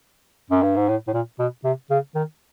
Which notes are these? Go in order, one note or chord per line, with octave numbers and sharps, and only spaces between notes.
F#2
G2
G#2
A2
A2
A#2
B2
C3
C#3
D#3